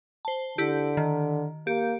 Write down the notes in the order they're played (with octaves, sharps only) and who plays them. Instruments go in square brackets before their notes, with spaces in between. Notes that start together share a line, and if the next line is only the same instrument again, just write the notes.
[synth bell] C5 A5
[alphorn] D3 [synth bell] E4 G4
[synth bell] D#3
[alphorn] A#3 [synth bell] G4